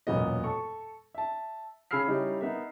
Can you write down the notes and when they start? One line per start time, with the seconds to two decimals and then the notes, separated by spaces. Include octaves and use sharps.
0.07 E1 F#2 A#2 B3 D#5
0.44 A4 C#6
1.15 E5 A5
1.91 C#3 G#4 B5 E6 F6 C7
2.07 G3 C#4 D#4 E4
2.41 B3 D#4 A#4 E5